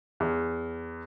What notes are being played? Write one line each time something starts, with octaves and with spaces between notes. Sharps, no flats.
E2